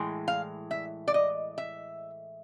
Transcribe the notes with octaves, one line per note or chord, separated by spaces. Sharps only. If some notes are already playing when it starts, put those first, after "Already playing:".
Already playing: A2 E3 G#3
F5
E5
D5
D#5
E5